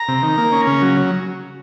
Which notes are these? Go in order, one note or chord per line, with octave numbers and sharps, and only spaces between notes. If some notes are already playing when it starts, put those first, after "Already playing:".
Already playing: A#5
C3
D#3
A#3
C#4
C#3
F#3